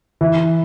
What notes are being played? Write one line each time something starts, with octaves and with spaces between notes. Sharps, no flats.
E3